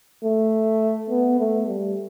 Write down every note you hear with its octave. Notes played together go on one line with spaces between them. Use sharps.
A3
B3
A3
G3